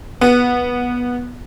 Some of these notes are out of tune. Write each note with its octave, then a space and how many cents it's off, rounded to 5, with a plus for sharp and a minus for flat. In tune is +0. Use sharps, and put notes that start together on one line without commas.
B3 -15